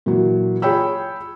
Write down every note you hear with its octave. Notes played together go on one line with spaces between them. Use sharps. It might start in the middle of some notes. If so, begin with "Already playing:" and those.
A#2 E3 F#3
F4 G#4 C#5 G5 B5 E6